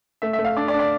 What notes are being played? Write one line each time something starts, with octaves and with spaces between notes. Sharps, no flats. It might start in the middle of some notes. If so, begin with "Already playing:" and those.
A3 E5
E5
A3
F5
D4 D5
D5
D4
D5